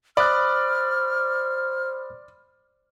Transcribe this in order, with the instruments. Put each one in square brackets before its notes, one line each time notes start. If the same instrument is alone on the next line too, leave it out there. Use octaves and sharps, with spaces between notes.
[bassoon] C5 [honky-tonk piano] D5 [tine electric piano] B5 D#6 F#6 [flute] F6